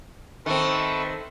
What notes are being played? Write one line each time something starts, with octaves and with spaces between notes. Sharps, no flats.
D#3 C4 A4 B4 E5 C#6